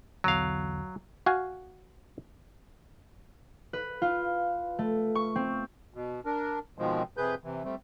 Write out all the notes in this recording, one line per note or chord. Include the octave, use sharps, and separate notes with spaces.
B1 E2 D3 F#3 F5
F#4 F5 G#5
B4
F4
A3
C#6
C4
B2
D4 A#4
B2 D#3 F3 G#3 C4
F2 C3 G#4 B4 G6
C3 E3
G3 A3 C4